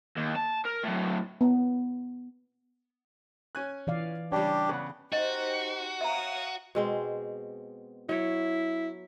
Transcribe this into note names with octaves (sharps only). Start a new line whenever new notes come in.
D#2
A5
A#4
A2 F#3
B3
C#4 G#5 F#6
E3 D5 F5
C#3 G3 D4 G4 C#5
C#3 B3 F#5
D#4 F#4 G4 C5 D#5
C#5 E5 F5 A#5 D#6
B2 G#3 C4
F#3 E4 C#5